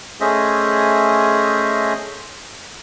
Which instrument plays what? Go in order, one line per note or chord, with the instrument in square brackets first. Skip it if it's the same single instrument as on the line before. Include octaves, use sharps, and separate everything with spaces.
[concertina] A3 C#4 G#4 C5 D#5 E5